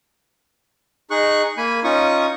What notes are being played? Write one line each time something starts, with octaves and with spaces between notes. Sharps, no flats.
D#4 G#4 C#6 F#6
A#3 G#5 B5
C#4 D#4 F4 C#6 D#6